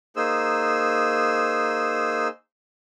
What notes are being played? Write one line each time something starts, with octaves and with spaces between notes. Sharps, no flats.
A#3 D#4 G#4 C5 E6